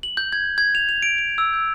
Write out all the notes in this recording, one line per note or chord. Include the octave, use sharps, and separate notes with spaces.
F#7
G6
G#6
G#6
F7
F7
D7
D7
E6
G6